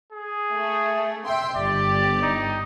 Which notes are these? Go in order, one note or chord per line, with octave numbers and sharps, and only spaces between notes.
G#4
A3
E5 G5 C6
G1 G4 D5
D#4